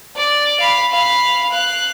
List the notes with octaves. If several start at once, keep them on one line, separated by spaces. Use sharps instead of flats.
D5
F5 B5
F5 B5
F5 F#6